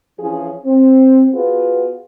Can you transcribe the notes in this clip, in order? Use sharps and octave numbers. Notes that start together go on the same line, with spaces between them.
E3 F3 C#4 E4 G#4
C4
B3 F4 F#4 G#4 B4